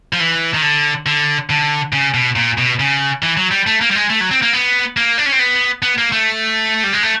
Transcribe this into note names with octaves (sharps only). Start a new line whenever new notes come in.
F3
E3
D#3
D3
D3
D3
C#3
B2
A#2
B2
C#3
E3
F#3
G3
A3
A#3
G3
G#3
A3
F#3
C4
A#3
B3
A#3
D4
C#4
C4
B3
B3
A#3
A3
G3
G#3
A3